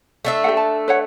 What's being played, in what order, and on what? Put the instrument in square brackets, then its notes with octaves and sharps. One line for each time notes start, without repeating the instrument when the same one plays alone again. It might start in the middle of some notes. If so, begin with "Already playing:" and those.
[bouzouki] A3 D4 E5
[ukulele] G4 A4 F#5
A5
B4 C#5 F#5